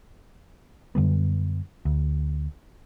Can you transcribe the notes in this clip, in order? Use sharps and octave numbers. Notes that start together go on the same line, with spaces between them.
F#2 D3 G3 B3
D2